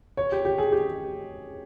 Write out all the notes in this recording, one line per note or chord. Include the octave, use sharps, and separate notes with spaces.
C#5
G4
G4
G#4
G4